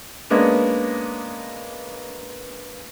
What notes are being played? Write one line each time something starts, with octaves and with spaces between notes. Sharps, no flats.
G#3 A#3 B3 C#4 D4